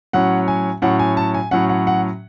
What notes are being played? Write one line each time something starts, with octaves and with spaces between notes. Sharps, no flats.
A2 F#3 C#4 F#5
G#5
A2 F#3 C#4 F#5
G#5
A5
G#5
A2 F#3 C#4 F#5
F#5
F#5